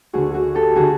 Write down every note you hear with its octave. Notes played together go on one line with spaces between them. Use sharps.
D2 D3 F#4 G#4
F#4 G#4
G4 A4
D3 F#4 G#4